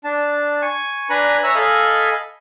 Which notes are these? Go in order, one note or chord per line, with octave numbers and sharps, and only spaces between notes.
D4 A5
G#5 C#6
D4 B4 G#5 A#5 B5
C#5 E5 G#5 A#5 E6 F#6
A4 D#5 F5 G#5 B5